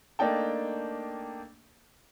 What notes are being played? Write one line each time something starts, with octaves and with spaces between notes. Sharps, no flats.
A3 A#3 D4 D#4 G5 A5